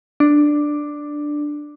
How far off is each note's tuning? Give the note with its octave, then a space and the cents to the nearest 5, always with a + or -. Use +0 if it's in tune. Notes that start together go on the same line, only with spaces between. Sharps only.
D4 +5